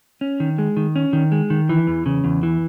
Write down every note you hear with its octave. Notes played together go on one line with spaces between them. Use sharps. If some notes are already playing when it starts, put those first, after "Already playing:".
C#4
D#3
G#3
D#3
C#4
D#3
G#3
D#3
E3
E2
C#3
E2
E3